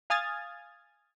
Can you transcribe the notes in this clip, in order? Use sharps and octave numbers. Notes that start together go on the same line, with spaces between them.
F5 G#5 D#6 F6 G#6 A6